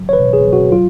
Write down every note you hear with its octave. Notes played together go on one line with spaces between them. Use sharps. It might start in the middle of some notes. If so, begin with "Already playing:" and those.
Already playing: F#3
C#5
B4
B2
G#4
F#3
F#4
F#3 F4